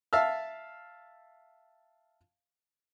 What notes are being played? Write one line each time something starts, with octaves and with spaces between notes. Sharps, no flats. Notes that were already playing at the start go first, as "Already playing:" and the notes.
E5 F5 A5 E6 F6